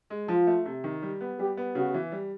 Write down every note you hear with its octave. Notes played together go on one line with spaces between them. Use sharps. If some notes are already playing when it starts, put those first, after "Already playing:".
G#3
F3 F4
A3
C3
D#3
G3
B3
G3 G4
B3
C#3 F#4
E3
G3